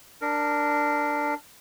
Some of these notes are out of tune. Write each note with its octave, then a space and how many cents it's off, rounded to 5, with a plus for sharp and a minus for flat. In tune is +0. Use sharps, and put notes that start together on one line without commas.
D4 +5 A#4 -10